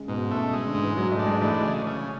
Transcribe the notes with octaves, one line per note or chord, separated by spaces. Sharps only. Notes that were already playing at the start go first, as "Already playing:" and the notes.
Already playing: C#3 G#3
G#2 B2
C#3
A3
C#3
C#3 G#3
D3
G#2
E3
G#2 F#3
A3
D4
G#3
E3 A3
C#3
C#3